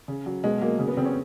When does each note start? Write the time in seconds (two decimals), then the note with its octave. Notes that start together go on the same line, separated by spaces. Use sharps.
0.08 C#3
0.26 F#3
0.44 B2 G#3
0.61 F#3 A#3
0.79 C#3
0.87 B3
0.97 C#3 C4
1.05 C#4